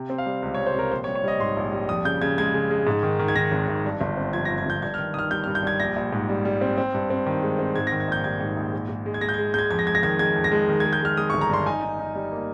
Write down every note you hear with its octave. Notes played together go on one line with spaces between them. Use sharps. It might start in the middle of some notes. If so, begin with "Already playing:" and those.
Already playing: C3
C4
F5
G3
C#2
C#5
G3
C5
C3 A#4
A#1 C5
C#5
G3
C#5
G3 D#5
G#2 C6
A#1
G3
F2 D#6
C#3 G6
C#3 G#6
G#3 G#6
C#3
G#3
G#2
D#3
D#3
G#6
D#3 A#6
G#1
G#1
G2
G1
C4
F3 G#6
A#6
G2
G#6
G1 G6
G2 G#6
F6
D#3
D#3 D#6 F6
G3 G6
F6
G2
G6
G3 G#6
A#1 A#6
A#1
G#2
G3
G3
C4
C4
G2
C4
D#3
G#3
C4
G#2 G#6
A#6
D#3
G#6
A#1 G6
G3 G#6
G#2
A#1
G#2
G#2
G#3
G#6
G#3 A#6
G6
G#6
G#3
G#3 G6 G#6
F2 G#6
A#6
G#3 G#6
A#6
D#3 G#6
G#3 G#6
F2
A#6
G#3
D#3
G#6
G#3
G6
G#3 F6
G#3 D#6
C#6
G1
A#5
G2 C6
D#4 G#5
D#4
D#4
G3
A#3